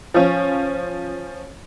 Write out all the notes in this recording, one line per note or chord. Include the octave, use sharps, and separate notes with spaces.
F3 C#4